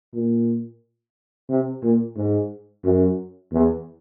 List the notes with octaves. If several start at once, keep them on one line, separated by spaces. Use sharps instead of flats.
A#2
C3
A#2
G#2
F#2
E2